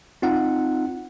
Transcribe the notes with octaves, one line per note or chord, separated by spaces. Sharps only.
C4 D#4 F4 F#5